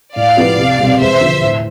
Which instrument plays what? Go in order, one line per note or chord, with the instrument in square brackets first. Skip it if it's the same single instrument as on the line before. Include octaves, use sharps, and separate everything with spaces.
[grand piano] A2 [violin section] D5 F5
[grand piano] F3 B3 E4 G4
C2
B2 G3 C4
[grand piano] E2 [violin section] C5 E5
[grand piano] D3 F3
A2